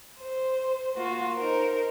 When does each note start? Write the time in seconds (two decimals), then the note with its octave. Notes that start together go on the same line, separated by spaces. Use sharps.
0.20 C5
0.97 A#3 F4 F#4
1.36 D#4 A#4 C5